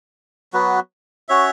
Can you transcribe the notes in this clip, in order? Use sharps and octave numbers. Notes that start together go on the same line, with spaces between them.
F#3 B3 F#4 B4
C#4 F#4 C#5 E5